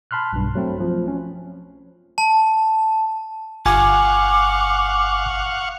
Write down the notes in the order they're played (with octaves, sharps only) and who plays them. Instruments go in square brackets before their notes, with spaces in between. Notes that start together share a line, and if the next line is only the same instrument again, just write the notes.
[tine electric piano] A5 B5 C6 F6 F#6
B1 G2
F#3 A3 C4
F3
C#4
[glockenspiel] A5
[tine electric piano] G1 G#5 [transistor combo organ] F5 F#5 C#6 [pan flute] D6